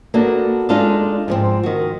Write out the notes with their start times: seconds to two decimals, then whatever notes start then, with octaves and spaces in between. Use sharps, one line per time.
0.14 A#3 B3 D4 F#4 A4
0.69 G#3 D4 D#4 F4 A4 D5
1.28 G#2 F3 C4
1.63 D#3 F#4